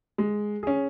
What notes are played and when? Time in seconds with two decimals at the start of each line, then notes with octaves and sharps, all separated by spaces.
0.18 G#3
0.63 C#4 G#4